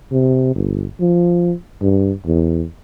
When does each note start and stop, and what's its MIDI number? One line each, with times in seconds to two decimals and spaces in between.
0.12 0.55 48
0.55 0.85 31
1.00 1.54 53
1.82 2.12 43
2.26 2.65 40